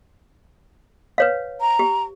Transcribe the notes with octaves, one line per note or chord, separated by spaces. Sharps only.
B4 C#5 F5
A#5
G4